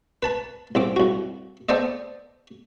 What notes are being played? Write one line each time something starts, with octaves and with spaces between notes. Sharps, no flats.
B4 A5 B5
C2 C4 D6
C2 F#4
B3 A4 C5 D5 D#5